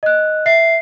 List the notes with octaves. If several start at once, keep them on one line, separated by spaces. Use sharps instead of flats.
D#5 F#6
E5 C7